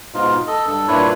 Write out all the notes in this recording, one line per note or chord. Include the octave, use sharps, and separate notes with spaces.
G#2 B2 D#4 F4
A4 D#5
G2 A4
G2 A#2 D4 E4 B4 C#5